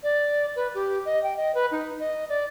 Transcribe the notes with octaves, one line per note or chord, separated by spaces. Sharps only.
D5
B4
G4
D#5
G5
D#5
B4
D#4
D#5
D5